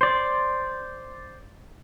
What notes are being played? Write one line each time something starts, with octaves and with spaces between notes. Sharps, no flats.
C5 D5